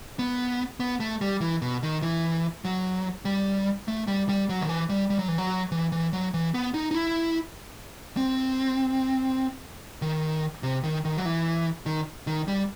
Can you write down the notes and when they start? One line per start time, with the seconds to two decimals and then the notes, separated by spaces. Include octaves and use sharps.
0.19 B3
0.80 B3
1.00 A3
1.21 G3
1.41 E3
1.62 B2
1.83 D#3
2.02 E3
2.65 F#3
3.25 G3
3.88 A3
4.08 G3
4.29 G3
4.49 F#3
4.61 D#3
4.69 E3
4.89 G3
5.10 G3
5.19 F#3
5.28 E3
5.38 F#3
5.72 E3
5.92 E3
6.13 F#3
6.34 E3
6.54 B3
6.74 D#4
6.91 D#4
6.95 E4
8.17 C4
10.02 D#3
10.63 C3
10.84 D#3
11.05 D#3
11.17 F#3
11.26 E3
11.86 D#3
12.27 D#3
12.48 G3